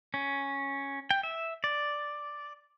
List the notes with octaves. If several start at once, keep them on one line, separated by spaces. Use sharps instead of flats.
C#4
G5
E5
D5